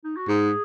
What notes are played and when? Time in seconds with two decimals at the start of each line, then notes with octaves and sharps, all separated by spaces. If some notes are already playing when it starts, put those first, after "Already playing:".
0.04 D#4
0.17 F#4
0.28 G#2 G#4